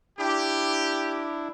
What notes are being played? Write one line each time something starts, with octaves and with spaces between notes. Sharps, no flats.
D4 E4 G4